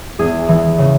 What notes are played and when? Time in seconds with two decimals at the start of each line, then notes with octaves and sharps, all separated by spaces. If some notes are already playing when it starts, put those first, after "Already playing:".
0.19 E2 G#4
0.48 E3
0.78 C#3